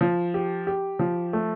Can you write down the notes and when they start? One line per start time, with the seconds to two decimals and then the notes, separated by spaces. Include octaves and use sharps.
0.01 F3
0.34 G4
0.67 G4
0.99 F3
1.33 A3